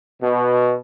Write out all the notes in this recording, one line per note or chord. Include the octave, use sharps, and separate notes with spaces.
B2